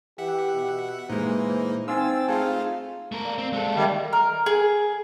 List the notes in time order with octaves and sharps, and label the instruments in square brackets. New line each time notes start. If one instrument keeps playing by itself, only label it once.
[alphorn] E3 [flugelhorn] G4 [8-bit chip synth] E5 F#5
[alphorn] B2
[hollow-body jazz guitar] A#2 G#3 [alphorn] E3 [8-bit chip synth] A#3 D#4 [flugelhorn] C5
[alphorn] C4 [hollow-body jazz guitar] D#4 F5 C6 [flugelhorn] G#5 [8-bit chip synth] E6 A6
[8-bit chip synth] A3 D#4 F4 [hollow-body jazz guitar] G#4 A5 [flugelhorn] F5
[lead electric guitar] A3 A#4
[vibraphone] D5 F5
[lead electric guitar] C4
G#3 A4
[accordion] D#3 G3 [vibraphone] D#5 E5
[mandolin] A#4
G#4